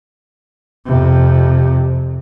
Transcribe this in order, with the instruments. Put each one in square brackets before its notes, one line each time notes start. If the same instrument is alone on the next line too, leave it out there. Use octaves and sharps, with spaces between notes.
[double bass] F2 C3